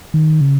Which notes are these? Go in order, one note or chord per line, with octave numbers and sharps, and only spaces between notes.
D#3
C#3